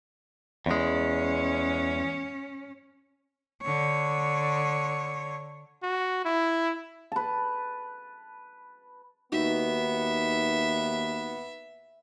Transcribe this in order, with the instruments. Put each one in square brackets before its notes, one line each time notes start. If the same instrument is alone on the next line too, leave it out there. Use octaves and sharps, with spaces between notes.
[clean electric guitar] E2 G#3 [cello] C#4
[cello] D3 C#5
[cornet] F#4
E4
[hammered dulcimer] B4 A5
[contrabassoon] D#2 [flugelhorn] B3 [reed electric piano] D#4 F#4 [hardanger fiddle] E5